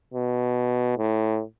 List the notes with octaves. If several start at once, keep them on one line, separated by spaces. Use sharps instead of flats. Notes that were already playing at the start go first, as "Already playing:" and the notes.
B2
A2